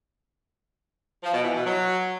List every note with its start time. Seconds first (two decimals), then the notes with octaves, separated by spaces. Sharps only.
1.23 F3
1.33 B2
1.44 E3
1.54 B2
1.65 F#3